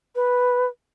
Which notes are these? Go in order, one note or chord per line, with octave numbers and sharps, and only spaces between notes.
B4